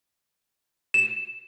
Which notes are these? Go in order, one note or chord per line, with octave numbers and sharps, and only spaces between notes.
E7